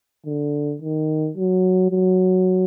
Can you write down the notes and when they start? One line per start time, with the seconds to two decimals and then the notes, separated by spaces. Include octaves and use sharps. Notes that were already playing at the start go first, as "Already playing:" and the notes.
0.26 D3
0.81 D#3
1.37 F#3
1.91 F#3